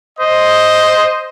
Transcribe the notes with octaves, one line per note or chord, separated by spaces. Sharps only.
C5 D#5